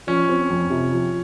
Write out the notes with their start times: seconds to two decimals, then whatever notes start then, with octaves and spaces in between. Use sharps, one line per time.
0.07 F3 C#4
0.29 C4
0.50 F2
0.70 C3
0.92 F3